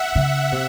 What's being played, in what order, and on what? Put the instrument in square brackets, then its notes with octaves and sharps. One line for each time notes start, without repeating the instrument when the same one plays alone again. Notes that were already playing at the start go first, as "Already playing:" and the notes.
Already playing: [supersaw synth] E5 F#5
[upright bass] C#3
C3